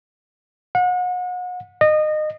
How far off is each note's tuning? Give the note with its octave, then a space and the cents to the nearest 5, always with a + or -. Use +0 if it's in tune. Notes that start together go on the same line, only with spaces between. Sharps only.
F#5 -35
D#5 -25